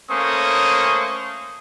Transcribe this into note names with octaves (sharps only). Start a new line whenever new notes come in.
A3 A#3 C#4 C5 C#6 D#6